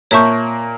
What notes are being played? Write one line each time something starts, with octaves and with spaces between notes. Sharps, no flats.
A#2 A#3 C#5 E5 A5 C#6 G6